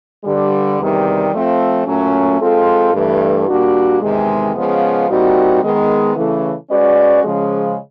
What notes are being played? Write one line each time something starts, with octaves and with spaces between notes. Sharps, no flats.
G2 D3 G3
E2 C3 D#3 G3
F3 A3 C4 F4
A#2 F#3 A3 C#4
G#3 C4 F4 A4
G2 E3 A3
A#2 G3 A#3 D4 F#4
E2 C3 D#3 G#3
C#3 F3 G#3 B3
A#2 G3 C4 D#4 F#4
D#3 G#3 B3
C#3 E3 A3
G#3 C#4 F#4 B4 D5
C#3 F3 G#3